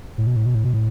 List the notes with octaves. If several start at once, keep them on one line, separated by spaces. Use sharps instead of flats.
A2
B2
A2
B2
A2
B2
A2